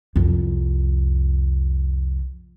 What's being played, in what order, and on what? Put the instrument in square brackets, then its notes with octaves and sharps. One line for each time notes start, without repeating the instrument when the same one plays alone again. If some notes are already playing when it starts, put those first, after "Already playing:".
[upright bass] C2 F2